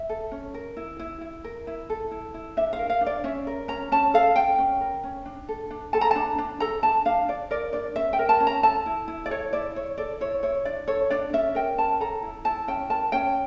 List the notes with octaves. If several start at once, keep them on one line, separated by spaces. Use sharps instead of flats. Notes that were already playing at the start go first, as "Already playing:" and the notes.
Already playing: E5
A4
C#4
A#4
E4
E4
E4
A#4
E4
A4
E4
E4
D4 E5
F5
A#4
F5
D4
D5
C#4 E5
A#4
C#4 A#5
C#4 A5
A4 F5
C#4 G5
C#4
A#4
C#4
D4
A4
D4
A4 A5
A#5
D4 A5
D4
A4 A#5
D4 A5
D4 F5
D4 D5
A#4 D5
D4 D5
C#4 E5
G5
A#4
A5
C#4
A#5
A4 A5
E4
E4
D5
A4 C#5
E4 D5
E4 C#5
A4 D5
E4 C#5
E4 C#5
D4 D5
A4 C#5
D4 D5
C#4 E5
A#4 G5
C#4 A5
A4 A#5
E4
E4 A5
C#4 G5
A#4 A5
C#4 G5